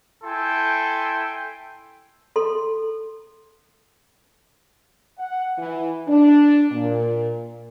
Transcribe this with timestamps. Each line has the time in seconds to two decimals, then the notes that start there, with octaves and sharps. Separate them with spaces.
0.24 E4 A4 G5 G#5 C6
2.36 A4 C6
5.18 F#5
5.58 E3
6.08 D4
6.72 A#2